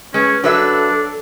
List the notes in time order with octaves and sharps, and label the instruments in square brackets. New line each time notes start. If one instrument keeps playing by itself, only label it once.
[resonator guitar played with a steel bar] G#3 [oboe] C#4 [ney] B4
[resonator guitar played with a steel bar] F#3 B4 E5 [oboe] D4 [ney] A4